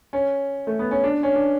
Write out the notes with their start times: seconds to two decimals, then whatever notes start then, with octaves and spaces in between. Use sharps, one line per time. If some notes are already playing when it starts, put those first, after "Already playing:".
0.13 C#4
0.67 A3
0.79 B3
0.91 C#4
1.04 D4
1.23 C#4
1.35 D4